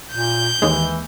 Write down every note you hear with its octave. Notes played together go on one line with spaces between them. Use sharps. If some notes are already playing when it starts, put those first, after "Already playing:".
A#2 G6
D#2 E3 G#3